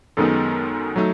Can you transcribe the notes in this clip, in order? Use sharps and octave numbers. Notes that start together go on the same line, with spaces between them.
F#2 D#3 G#3 B3 D#4 A4
F#3 A3 D#4